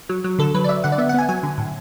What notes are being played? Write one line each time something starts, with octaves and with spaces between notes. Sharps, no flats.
F#3
F#3
D3 A4
F#3 B4
D5
F#3 E5
D3 F#5
D5
B3 E5
F#5
B3 G#5
F#3 G#5
D3
A2